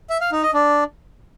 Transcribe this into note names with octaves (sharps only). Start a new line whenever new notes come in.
E5
F5
D#4
D#5
D4